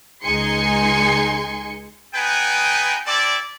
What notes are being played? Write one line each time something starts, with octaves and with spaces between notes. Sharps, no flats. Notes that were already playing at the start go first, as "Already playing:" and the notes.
C#2 G#3 D#4 G#5 C6 C#7
B3 D#4 G#4 B4 G5 G#5
C4 E4 A4 D5